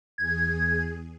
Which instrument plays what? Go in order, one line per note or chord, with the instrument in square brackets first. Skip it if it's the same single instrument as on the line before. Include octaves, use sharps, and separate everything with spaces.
[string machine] E2 G#4 [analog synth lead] G#6